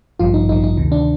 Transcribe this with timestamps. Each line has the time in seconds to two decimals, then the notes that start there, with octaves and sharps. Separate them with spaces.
0.19 A1 G2 F3 F4
0.34 D#4
0.48 A1 G2 F3 D#4
0.64 D#4
0.77 D2 C3 D#3
0.92 D4